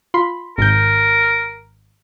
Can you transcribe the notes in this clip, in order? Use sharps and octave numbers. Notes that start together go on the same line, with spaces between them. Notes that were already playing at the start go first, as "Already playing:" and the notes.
F4 B5 C6
G#1 A#4 G6